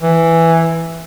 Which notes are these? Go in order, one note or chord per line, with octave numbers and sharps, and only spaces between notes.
E3